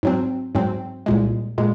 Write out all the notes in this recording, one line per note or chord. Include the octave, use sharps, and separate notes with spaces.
G#2 F#3 C4
G#2 F#3 C4
C2 A#2 G#3
A#2 G#3